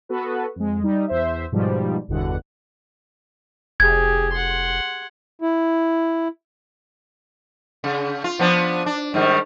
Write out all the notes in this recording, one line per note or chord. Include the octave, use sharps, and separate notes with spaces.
B3 F#4 A4 B4
F2 G#3
G3 D#4
E2 C5 E5
G#2 B2 F3 G3
G1 E2 B2 D3 F#5
F1 G4 G#4 G#6
F#5 C6
E4
C#3
F4
F3 B3 D4
D4
G#2 D#3 G3